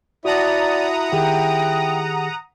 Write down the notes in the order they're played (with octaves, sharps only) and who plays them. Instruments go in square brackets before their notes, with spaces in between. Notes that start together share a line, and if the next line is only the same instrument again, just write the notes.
[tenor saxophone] E4 [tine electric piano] F#4 A5 [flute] D5 [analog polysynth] F#5 A#5 D#6
[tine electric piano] D#3 G4 G#4 [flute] G5